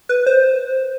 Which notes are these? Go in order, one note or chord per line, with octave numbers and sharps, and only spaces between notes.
B4
C5